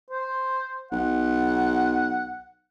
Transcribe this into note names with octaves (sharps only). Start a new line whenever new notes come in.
C5
B1 F#5